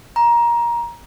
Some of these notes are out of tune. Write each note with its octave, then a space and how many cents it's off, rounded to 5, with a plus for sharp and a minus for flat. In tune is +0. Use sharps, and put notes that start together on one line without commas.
A#5 +20